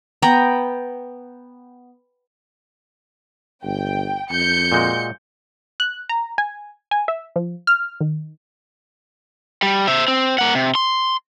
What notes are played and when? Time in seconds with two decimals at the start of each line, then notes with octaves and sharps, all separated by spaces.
0.22 B3 G5 A#5
3.64 G1 G5
4.31 F2 G6 C#7
4.72 A#2 G#3 F#4
5.80 F#6
6.09 A#5
6.38 G#5
6.91 G#5
7.08 E5
7.36 F3
7.67 F6
8.01 D#3
9.62 G3
9.88 C5 E5
10.08 C4
10.38 A#3 F#5
10.55 C3
10.75 C6